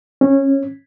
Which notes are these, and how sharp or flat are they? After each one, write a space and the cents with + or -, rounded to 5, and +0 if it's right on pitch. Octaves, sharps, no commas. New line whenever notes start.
C#4 -20